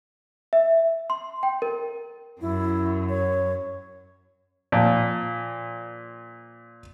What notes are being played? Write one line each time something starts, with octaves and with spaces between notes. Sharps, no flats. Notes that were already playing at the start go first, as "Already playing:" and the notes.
E5
C6
G5
A#4
F#2 E4
C#5
A#2 F3